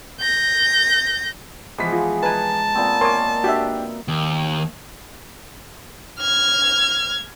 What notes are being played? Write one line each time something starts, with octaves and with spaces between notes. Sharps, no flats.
G6 A#6
E3 F3 G#3 B3 B6
F4
D#4 B4 G#5 A5
A#2 B3 C4
A#4 C#5 G#5 C6 D6
D4 F#4 G4 E5
D#2
F6 G#6